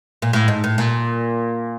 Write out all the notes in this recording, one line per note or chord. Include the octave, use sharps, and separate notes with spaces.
A#2
A2
G#2
A2
A#2